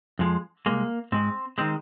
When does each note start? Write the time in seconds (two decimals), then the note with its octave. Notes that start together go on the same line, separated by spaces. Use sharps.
0.19 F2 F3 G#3
0.66 C2 A#2 G#3 A#3
1.12 G#2 G#3 C4
1.58 D#3 G#3 C4